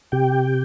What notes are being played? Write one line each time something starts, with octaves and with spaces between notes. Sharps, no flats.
C3 G4 G5